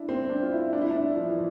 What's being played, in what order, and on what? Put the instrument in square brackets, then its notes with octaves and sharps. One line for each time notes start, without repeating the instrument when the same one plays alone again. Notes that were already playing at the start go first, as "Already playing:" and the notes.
Already playing: [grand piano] D4 E4
C4
D4
F4
E4
D4
E4
D4
F3
E3